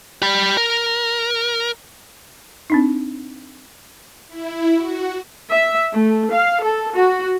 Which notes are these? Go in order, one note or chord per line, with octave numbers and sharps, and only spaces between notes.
G4 B5
A#4
C4 D4 D#4
E4
F#4
E5
A3
F5
A4
F#4